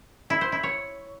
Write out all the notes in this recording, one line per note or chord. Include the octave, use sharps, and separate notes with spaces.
E4
C5
E4
C#5